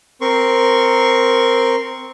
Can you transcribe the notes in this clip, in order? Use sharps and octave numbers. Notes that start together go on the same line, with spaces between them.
C4 A#4 C6 C#6